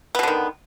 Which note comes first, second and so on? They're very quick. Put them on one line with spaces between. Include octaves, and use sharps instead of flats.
B3 B2 D3 D#3